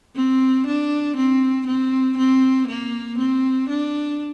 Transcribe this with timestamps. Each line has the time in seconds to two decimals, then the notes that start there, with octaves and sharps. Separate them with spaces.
0.16 C4
0.67 D4
1.16 C4
1.67 C4
2.18 C4
2.68 A#3
3.18 C4
3.69 D4